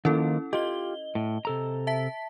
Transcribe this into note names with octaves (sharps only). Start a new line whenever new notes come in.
D#3 F3 A#3 C#4 E4 A4
F4 G4 D#5 G7
A2
C3 A4 A#5
E5 A5 B6